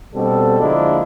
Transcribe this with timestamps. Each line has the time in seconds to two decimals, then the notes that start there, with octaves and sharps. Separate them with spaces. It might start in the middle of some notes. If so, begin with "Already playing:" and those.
0.14 B2 G3 C4 D4 A4
0.60 D3 F3 G#3 A#3 D4 E4